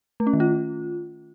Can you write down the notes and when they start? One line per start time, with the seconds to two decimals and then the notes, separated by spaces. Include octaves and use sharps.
0.20 A3
0.27 C#4
0.33 D#3
0.40 F4